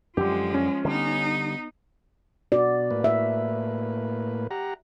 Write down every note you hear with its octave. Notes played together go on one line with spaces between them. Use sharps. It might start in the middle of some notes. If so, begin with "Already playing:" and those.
F#2 D3 F3 G#3 G4
C#4
D3 G3 B3 D#4
B2 F#4 D5
A2 A#3 B4
E5
G4 F#5 A#5